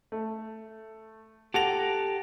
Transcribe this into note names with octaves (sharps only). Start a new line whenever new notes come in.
A3
G4 A4 F#5 A#6 F7